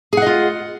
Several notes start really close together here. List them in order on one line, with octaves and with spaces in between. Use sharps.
G#4 F#5 D#5 F4